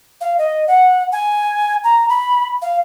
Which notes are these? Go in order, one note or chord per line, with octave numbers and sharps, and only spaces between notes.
F5
D#5
F#5
G#5
A#5
B5
F5